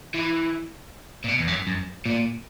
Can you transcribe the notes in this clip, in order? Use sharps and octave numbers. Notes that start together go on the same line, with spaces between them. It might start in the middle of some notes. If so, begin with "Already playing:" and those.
E3
A#2
B2
E2
F#2
F#2
A#2